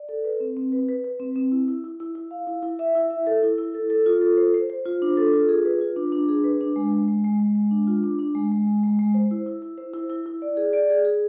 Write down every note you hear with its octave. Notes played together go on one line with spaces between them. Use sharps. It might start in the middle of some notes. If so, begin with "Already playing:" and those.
Already playing: D5
A4
B4
C4
C4
B4
B4
B4
C4
C4
E4
E4
E4
E4
E4
F5
E4
E4
E5
E4
E5
A4
E4
E4
A4
A4
F4
A4
C5
C5
C5
F4
D4
A4
F4
G#4
B4
F4
D4
D4
G#4
B4
D4
G#3
G#3
G#3
G#3
G#3
G#3
D4
F4
D4
D4
G#3
G#3
G#3
G#3
G#3
C5
E4
E4
E4
C5
E4
E4
E4
D5
G#4
D5
G#4
G#4